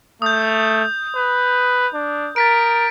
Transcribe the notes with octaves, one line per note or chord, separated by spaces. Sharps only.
A3 D#6 G6
B4
D4
A#4 A6 B6 D7